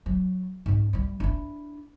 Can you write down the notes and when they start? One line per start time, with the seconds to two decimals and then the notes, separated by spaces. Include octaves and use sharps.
0.06 F#3
0.66 G#2 C#4
0.93 G3 E4
1.20 D4 E4